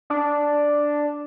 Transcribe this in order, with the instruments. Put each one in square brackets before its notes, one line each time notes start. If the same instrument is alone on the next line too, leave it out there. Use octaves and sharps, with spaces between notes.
[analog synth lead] D4